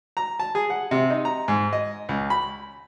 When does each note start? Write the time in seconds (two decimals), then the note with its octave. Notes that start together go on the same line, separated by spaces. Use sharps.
0.17 A#5
0.39 A5
0.55 G#4
0.70 F#5
0.91 C3
1.10 D#4
1.25 A#5
1.48 G#2
1.73 D#5
2.09 C#2
2.30 B5